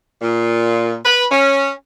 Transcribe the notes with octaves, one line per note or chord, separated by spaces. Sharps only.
A#2
B4
C#4